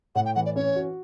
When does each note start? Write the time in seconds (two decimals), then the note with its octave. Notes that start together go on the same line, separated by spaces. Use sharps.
0.15 A2 F#5
0.25 G5
0.35 E3 F#5
0.45 D5
0.56 C#4 C#5
0.76 F#4